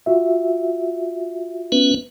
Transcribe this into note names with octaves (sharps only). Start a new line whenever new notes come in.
F4 F#4 E5
B3 C#4 B4